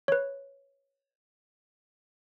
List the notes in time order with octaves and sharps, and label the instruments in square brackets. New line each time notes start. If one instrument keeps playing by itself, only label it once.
[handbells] B4 C#5